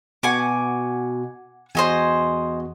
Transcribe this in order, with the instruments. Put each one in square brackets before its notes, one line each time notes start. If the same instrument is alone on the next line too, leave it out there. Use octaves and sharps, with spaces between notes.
[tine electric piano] B2 F#4 [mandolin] F#5 G#5 D6
[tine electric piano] E2 F#4 [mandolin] C5 D#5 G#5